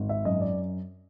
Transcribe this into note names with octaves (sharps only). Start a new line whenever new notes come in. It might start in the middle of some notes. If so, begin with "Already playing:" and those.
Already playing: G#1
E5
F#2 D#5
D5